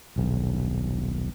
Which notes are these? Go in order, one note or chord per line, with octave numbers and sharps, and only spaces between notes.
D#1 B1